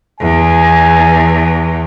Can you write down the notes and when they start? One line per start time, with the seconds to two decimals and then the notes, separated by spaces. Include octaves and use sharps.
0.20 E2 G#5